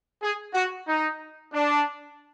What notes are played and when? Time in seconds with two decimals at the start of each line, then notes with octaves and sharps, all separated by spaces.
0.22 G#4
0.53 F#4
0.87 D#4
1.53 D4